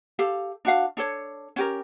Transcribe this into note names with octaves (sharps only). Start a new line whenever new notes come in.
G4 A4 F5
D4 F#4 F5
D4 A4 C#5
C#4 G4 A#4